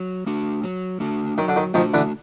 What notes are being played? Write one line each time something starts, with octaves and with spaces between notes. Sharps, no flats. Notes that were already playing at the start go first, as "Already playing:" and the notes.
Already playing: F#3
A3 D4 F#4
F#3
A3 D4 F#4
D#3 F#3
D3
D#3
D#3 F3 A3 D4 F#4
D3 E3